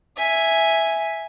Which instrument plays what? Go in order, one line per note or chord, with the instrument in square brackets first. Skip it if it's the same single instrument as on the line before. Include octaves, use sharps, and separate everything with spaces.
[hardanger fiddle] E5 G#5